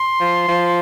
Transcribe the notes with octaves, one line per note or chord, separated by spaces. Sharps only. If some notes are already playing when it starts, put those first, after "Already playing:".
Already playing: C6
F3
F3